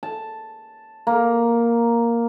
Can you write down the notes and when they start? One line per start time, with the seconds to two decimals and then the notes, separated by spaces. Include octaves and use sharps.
0.03 A5
1.07 A#3